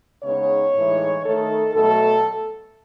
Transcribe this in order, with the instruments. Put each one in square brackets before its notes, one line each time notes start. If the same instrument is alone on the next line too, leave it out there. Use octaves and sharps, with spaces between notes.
[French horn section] C#3 G#3 B3 D#4 C#5
A2 E3 G#3 D#4
D#3 A3 D#4 A4
B2 F#3 A3 A4